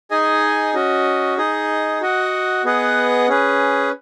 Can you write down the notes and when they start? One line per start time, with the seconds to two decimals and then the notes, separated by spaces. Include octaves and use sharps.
0.11 D#4 G#4 D#5 G#5
0.74 C#4 F#4 D#5
1.38 D#4 G#4 D#5
2.01 F#4 D#5 F#5
2.64 B3 G#4 B4 D#5 F#5
3.28 C#4 G#4 B4